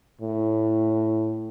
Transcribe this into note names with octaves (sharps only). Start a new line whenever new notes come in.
A2